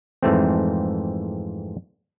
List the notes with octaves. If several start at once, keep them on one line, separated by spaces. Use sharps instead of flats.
F2 G#2 E3 A3 C4